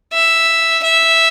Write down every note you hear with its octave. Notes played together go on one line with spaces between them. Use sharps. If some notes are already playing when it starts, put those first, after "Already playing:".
E5
E5